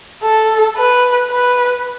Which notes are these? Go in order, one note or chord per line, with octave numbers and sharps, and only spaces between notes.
A4
B4
B4